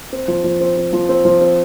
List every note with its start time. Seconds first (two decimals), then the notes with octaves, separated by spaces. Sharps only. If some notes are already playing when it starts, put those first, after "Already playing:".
0.13 C4
0.28 F3
0.44 F3
0.61 C4
0.77 C4
0.93 F3
1.09 C4
1.25 F3
1.41 C4